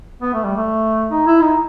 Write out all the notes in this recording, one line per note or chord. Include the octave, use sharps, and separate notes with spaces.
B3
A3
G3
A3
D#4
E4
D#4